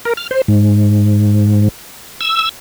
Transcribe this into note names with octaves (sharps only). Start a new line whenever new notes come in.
A#4
F6
C5
G#2
E6